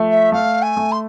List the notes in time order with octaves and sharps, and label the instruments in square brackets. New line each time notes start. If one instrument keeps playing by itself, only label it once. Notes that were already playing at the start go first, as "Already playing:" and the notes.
Already playing: [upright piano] F3 A3
[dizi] E5
[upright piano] A3 [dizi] F5
[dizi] G#5
[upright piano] A3
[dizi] C6